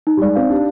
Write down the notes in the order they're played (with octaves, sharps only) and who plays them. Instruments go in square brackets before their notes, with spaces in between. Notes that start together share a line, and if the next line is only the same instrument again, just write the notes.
[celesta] D#4
[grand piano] G3
[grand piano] G#3 [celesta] D5
[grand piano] C4 [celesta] F5
[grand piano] D4 [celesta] G4